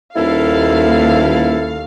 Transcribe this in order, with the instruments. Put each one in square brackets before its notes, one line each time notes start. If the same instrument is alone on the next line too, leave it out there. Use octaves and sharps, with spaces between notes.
[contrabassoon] D#1 [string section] D#2 F5 [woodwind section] E4 A4